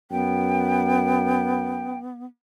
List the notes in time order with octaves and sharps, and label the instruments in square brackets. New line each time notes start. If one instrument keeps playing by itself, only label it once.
[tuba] F#2 [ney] B3 [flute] G5